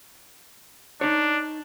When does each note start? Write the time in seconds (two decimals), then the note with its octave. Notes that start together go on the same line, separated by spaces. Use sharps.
1.01 D4 D#4 C#5